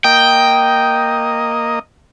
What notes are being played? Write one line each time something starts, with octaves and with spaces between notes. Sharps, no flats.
A#3 D#5 G5